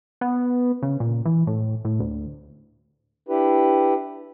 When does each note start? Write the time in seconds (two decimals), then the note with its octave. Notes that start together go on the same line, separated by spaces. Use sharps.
0.21 B3
0.83 C#3
1.00 A#2
1.25 E3
1.47 A2
1.85 A2
2.00 D2
3.29 D4 E4 G4 B4